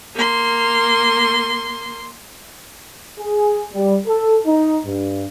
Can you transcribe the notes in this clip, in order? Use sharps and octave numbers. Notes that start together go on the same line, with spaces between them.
A#3 C6
G#4
G3
A4
D#4
G2